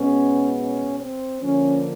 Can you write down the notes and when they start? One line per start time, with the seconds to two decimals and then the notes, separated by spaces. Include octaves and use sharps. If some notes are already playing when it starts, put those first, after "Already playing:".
Already playing: B2 G#3 B3 C#4
0.57 C#4
0.99 C4
1.40 D3 F3 A#3 C#4